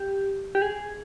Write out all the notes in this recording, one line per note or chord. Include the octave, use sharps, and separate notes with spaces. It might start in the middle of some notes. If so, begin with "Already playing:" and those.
Already playing: G4
G4
G#4